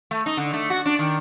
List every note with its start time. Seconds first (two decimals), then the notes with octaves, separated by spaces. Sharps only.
0.11 A3
0.26 D#4
0.37 D3
0.53 A3
0.70 F#4
0.86 D4
0.99 D#3